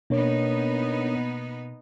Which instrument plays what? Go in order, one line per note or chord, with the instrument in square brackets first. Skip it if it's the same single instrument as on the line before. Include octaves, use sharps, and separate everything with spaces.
[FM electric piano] B2 A#3 [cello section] B3 D#4 [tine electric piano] D4 A#4 C#5